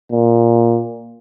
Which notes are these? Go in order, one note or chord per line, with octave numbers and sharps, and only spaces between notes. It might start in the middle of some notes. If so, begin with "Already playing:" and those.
A#2